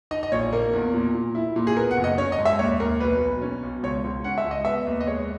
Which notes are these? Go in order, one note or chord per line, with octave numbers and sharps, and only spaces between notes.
D#4 D#5
D#5
A#1 C#5
A#3 A#4
E2
A#2
A#2
E4
A#2
G#4
B3 A#4
F#5
F#1
D#5
C#4 C#5
D#5
G#2
E5
D#2 C#5
D#2 A#4
B1 B4
B1
C#4
B1
C#2 C#5
C#2
C#4 F#5
E5
C#2
D#5
B3 E5
D#2
D#5
G#3 C#5